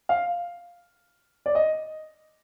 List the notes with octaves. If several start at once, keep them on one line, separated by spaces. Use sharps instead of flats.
F5
D5
D#5